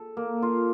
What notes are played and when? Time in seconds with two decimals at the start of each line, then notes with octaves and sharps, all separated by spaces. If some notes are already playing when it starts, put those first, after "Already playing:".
Already playing: A4
0.17 A#3
0.42 F4